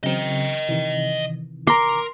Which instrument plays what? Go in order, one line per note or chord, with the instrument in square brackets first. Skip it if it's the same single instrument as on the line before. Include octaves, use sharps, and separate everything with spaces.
[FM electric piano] C#3 F#3 C4 [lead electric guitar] D#5 G5
[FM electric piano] C3 D#3 E3
[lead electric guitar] A#4 [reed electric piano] A#5 D6 [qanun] C6